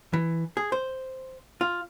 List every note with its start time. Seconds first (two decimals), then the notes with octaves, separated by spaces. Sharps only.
0.13 E3
0.57 G#4
0.72 C5
1.61 F4